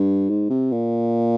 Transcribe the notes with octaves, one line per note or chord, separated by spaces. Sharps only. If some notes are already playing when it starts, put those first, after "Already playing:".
Already playing: G2
G#2
C3
A#2